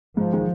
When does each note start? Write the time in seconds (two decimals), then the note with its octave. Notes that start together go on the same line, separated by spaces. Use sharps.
0.16 G#2 F3
0.33 D#3 G#3